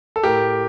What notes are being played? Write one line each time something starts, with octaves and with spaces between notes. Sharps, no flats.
A4
A2 G4 A#4